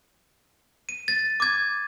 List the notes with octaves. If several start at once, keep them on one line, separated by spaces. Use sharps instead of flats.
D#7
A6
D6 G#6